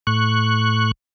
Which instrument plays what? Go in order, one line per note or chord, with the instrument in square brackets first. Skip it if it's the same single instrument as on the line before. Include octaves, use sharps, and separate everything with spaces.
[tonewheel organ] A2 C#6 F#6